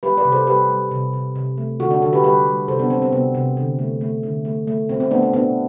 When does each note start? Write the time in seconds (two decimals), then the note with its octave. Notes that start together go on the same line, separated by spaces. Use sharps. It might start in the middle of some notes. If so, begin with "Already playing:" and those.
0.03 G3 G4 B4
0.18 B4 D5
0.25 C3
0.32 A4 C5
0.47 G3 G4 B4
0.69 G3
0.91 C3
1.13 C3
1.35 C3
1.58 A3
1.80 D3 F#4 A4
1.91 D4 F#4
2.02 D3 F#4 A4
2.13 G4 B4
2.24 G3 G4 B4
2.46 G3
2.68 C3 A4 C5
2.79 B3 D4
2.90 G3 C4
3.02 C4
3.12 C3 B3
3.35 C3
3.57 D3
3.79 A3
4.01 A3
4.23 D3
4.45 A3
4.67 A3
4.89 B2 C4
5.00 C4
5.11 A3 B3 D4
5.23 C4
5.33 B2 B3 D4